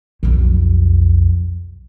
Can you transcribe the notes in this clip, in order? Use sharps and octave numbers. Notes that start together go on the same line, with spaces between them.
B1 F2